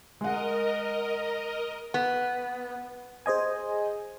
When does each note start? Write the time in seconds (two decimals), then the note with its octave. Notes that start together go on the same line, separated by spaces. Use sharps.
0.21 G#3 A#4 D#5 F#5
1.94 B3
3.26 G#4 C5 D#5 G#5